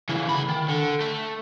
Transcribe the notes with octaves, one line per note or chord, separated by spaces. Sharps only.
C#3 E3
D2 B5
D#3
D3
A3